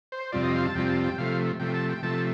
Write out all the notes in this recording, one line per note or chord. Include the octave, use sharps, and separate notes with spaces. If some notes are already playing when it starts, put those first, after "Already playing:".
C5
F2 C3 G3 C4 F4 D5
D#5
F5
A5
F2 C3 G3 C4 F4 G5
A5
G5
C3 F3 A3 F5
C3 F3 A3 G5
A5
G5
C3 F3 A3 A5